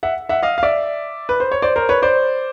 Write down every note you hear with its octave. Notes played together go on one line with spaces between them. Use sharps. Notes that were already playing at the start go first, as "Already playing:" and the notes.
E5 F#5
E5 F#5
D#5 F5
F5
D5 E5
B4
C5
C#5
C5 D5
A#4 C5
B4 C#5
C5 D5